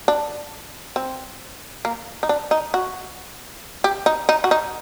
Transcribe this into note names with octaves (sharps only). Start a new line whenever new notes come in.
D4
C4
A#3
D#4
D4
D#4
F#4
G4
D#4
D#4
F#4
D#4